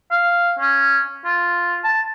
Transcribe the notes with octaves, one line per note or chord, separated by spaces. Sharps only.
F5
C#4
F4
A5